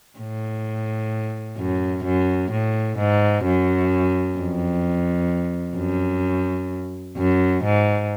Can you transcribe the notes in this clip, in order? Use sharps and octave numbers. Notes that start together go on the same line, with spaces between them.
A2
F#2
F#2
A2
G#2
F#2
F2
F#2
F#2
G#2